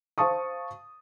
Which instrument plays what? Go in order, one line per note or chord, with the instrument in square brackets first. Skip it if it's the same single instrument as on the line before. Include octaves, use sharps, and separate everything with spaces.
[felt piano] C5 F5 A5 C#6 D#6